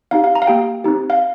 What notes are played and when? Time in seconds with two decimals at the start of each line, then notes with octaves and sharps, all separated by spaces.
0.11 C4 D#4 G4 F5
0.24 F5
0.35 A#5
0.42 F5
0.47 A#3 G4 G5
0.84 C4 D#4 G4
1.10 F5